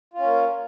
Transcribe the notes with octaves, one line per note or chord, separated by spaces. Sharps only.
A#3 C#4 F4